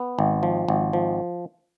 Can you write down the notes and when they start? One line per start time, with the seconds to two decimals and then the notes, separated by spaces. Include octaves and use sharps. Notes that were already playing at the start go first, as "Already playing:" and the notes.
Already playing: B3
0.19 G#1
0.43 F3
0.68 G#1
0.93 F3